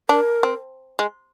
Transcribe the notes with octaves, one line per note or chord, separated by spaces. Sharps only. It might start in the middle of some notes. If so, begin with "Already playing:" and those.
D4 A#4
C4
G#3